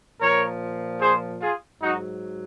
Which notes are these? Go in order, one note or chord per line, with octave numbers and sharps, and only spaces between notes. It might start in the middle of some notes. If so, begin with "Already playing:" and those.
A#2 F3 A#4 C#5
G#4 C5
F4 G#4
G#2 F#3 D#4 F#4